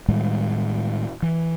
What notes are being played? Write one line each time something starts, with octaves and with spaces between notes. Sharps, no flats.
A2 D#3 G3 G#3
E3